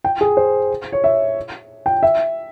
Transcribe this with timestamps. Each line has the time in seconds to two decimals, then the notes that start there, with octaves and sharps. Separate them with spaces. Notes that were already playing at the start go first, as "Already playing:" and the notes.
0.04 G5
0.21 G#4
0.37 C5
0.92 C#5
1.04 E5
1.86 G5
2.03 E5